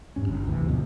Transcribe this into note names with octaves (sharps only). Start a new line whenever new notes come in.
G2 C#4
G1
D2 C3 E3
D2 G2 B2 F3